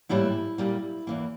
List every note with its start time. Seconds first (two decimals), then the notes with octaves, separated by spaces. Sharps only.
0.09 A2 E3 G3 A#3 E4
0.58 A#2 G3 A#3
1.07 E2 E3 A#3